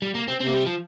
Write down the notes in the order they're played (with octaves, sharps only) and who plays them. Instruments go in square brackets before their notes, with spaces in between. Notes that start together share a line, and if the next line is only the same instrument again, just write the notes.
[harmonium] A#2 [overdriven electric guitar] G3
[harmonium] C3 [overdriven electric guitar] A#3
[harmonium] C3 [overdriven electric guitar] C4
[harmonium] C3 [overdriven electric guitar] C4
[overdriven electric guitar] A#3
G3
F3